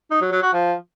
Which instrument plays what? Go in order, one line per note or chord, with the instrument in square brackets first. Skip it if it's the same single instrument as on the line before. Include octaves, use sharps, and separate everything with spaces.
[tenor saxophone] D#4
F#3
F#3
F#4
F3